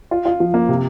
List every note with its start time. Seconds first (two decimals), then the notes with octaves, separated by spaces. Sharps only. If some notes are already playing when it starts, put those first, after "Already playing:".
0.11 F4
0.26 F4
0.40 F3
0.54 A#3
0.69 C3